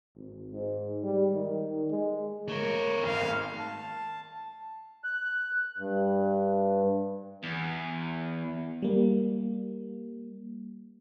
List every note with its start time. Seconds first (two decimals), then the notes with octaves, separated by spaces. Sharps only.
0.15 G#1
0.51 G#2
1.03 G3
1.33 D#3
1.91 G#3
2.49 A3 A#4 C#5
3.03 G#1 F5
3.58 A5
5.04 F#6
5.78 G2
7.43 E2
8.82 G3 A#3